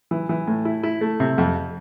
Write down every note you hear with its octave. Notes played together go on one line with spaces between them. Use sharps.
E3
E3
A2
E4
E4
A3
C3
F2